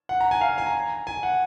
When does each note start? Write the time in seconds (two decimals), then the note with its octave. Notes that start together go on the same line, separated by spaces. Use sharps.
0.09 F#5
0.21 A#5
0.31 G#5
0.41 F5
0.58 G#5
0.66 A#5
1.07 G#5
1.23 F#5